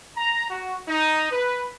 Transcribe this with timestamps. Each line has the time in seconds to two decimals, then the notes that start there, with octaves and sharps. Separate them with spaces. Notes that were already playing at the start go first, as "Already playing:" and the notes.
0.17 A#5
0.50 F#4
0.88 D#4
1.31 B4